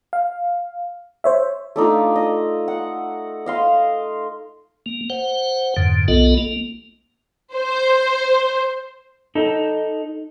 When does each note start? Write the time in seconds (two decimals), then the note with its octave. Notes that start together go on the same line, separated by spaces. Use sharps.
0.13 F5
1.24 C5 C#5 E5
1.76 A3 D4 D#4 F4
2.16 D#5
2.68 F#5
3.46 D#5 F5 C6
4.86 A#3
5.10 C5 F#5
5.77 F2 G#2 D3
6.08 B1 B3 F4 A4 D#5
6.38 A#3
7.54 C5
9.35 D#4 A4